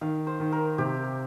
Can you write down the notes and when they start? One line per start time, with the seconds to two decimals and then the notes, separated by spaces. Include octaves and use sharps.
0.01 D#3 F5
0.27 C5
0.40 D#3
0.52 A#4
0.78 C3 G4